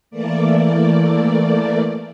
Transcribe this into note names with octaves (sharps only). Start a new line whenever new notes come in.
E3 A3 A#3 D5